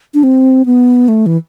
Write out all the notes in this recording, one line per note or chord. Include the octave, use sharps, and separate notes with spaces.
D4
C4
B3
A3
E3